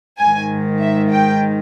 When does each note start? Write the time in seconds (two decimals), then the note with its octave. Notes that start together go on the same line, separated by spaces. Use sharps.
0.18 G#2 D#3 G#5
0.79 E5
1.10 G5